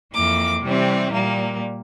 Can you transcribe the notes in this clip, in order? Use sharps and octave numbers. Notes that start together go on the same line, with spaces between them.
F2 E3 A#3 D6
C3 E3 G3 C4
A#2 G3 A#3